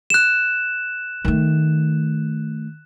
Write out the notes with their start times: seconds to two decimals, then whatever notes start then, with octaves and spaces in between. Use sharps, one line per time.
0.10 F#6 E7
1.25 D#3 A3